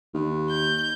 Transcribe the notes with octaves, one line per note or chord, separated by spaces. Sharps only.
D#2
G6